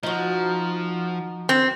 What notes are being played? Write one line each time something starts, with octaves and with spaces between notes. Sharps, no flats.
F3 D#4 F#4
C4